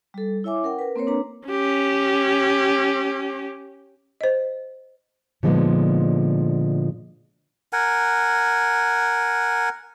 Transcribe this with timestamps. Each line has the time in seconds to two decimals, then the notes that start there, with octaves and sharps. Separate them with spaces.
0.14 G3 A4
0.44 E4 C#5 E5 G#5 D6
0.63 C#4 A#4 F#5 G5
0.79 A#4 B4
0.96 A#3 C4 A#4 C5 C#5
1.07 D4 B4 A#5
1.48 C#4 G4
4.21 C5 D#5
5.43 A#2 D3 F3 G#3 B3 D#4
7.73 A#4 F#5 G#5